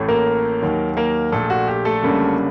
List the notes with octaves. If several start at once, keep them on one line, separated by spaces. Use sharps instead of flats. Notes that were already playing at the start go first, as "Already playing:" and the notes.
Already playing: A1 A2 A3
A#3 A#4
D#2 D#3 F#3
A#3 A#4
A#1 A#2 A3 A4
F#4
G4
A3 A4
F#1 F#2 D3 G3 A#3